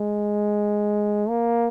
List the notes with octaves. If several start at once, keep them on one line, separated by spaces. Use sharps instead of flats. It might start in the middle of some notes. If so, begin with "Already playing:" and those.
Already playing: G#3
A#3